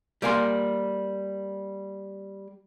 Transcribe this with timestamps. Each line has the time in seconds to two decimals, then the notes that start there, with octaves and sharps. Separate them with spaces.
0.22 G3 A#3 A#4 G#5 C6